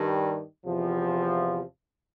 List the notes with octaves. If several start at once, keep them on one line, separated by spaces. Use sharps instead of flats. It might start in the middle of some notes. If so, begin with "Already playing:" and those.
Already playing: G2 D#3 G3
E2 C3 F3